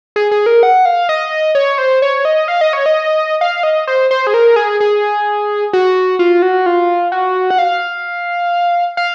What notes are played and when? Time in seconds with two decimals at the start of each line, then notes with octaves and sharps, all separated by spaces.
0.16 G#4
0.31 G#4
0.46 A#4
0.63 F#5
0.85 F5
1.09 D#5
1.55 C#5
1.78 C5
2.02 C#5
2.25 D#5
2.48 F5
2.61 D#5
2.73 C#5
2.86 D#5
3.41 F5
3.63 D#5
3.87 C5
4.11 C5
4.27 G#4
4.34 A#4
4.56 G#4
4.80 G#4
5.73 F#4
6.19 F4
6.42 F#4
6.66 F4
7.12 F#4
7.50 F#5
7.58 F5
8.97 F5